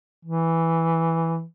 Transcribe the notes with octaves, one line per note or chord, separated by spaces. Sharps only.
E3